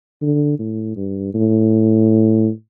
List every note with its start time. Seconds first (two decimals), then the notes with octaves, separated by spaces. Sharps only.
0.22 D3
0.59 A2
0.96 G2
1.34 A2